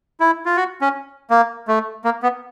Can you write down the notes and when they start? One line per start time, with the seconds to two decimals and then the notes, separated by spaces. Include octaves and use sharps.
0.20 E4
0.45 F4
0.57 F#4
0.81 C#4
1.30 A#3
1.68 A3
2.04 A#3
2.23 B3